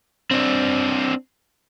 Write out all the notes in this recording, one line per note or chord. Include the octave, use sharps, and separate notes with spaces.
C4 D4